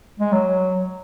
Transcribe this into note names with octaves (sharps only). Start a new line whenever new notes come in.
G#3
F#3